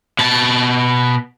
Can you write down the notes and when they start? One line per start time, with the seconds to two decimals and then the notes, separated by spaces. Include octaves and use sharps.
0.19 B2 A5